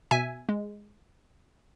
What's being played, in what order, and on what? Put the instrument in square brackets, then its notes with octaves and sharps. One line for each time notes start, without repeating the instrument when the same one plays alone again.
[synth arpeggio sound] B2 E5 G#5
G#3